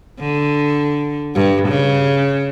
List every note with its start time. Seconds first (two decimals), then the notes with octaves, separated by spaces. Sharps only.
0.20 D3
1.35 G2
1.68 C#3